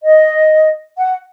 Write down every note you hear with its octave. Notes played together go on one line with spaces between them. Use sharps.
D#5
F#5